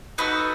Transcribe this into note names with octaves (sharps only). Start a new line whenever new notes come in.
D#4 F#4 A4 B4